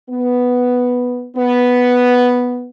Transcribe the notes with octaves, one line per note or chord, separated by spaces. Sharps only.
B3
B3